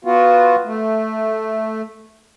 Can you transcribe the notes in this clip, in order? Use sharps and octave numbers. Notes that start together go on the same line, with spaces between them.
B3 F4 F#4
A3